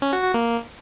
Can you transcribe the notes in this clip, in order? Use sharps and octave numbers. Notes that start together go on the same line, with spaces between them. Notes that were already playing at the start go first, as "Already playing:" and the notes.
C#4
F#4
F#4
A#3